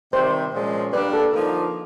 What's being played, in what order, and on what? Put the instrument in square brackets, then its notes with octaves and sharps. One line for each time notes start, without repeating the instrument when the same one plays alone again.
[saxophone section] C3 D#3 G3 C4 [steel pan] C5
[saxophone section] A#2 F3 G#3 C#4
[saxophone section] G3 A#3 D4 [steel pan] B4
[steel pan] A4
[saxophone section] D3 F3 A#3 D#4 [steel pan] A#4